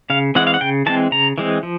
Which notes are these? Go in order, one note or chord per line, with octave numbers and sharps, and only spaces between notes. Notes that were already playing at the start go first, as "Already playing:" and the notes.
C#3 F5
E3 G#3 C4 F#5
F5
F#5
C#3 G5
E3 G#3 C4 A5
C#3 A#5
E3 G#3 C4
F3